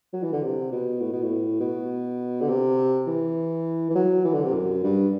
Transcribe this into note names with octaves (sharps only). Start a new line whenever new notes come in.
F#3
E3
D3
C3
B2
A2
B2
A2
B2
D3
C3
E3
E3
F#3
E3
D3
C3
F#2
G2